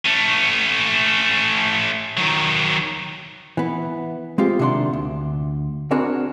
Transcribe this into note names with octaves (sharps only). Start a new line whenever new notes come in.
A3 C#4
D#3 F#3
E3 B3
G#3 C4 F4 G4
C3 D#3 A#3 D4 F#5 C6
D2
B3 C4 D4 F#4 G#4 A#4